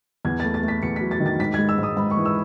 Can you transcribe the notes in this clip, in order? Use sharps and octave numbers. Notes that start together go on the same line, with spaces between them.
E2 G#6
A3 A6
A6
A3
B6
E2 C#7
F#3 B6
A6
D#3
A6
G#2 B6
G#3 G#6
E6
G#2
D#6
G#2 B5
C#6
E3
E6